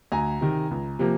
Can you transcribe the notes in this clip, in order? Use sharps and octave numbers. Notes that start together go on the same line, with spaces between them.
D2 G#5 A#5
C3 D#3
C#2
C3 F3 A#3